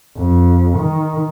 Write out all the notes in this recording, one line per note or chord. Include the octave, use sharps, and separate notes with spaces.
F2
D#3